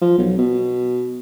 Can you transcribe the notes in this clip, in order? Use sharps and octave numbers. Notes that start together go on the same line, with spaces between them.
F3
B1
B2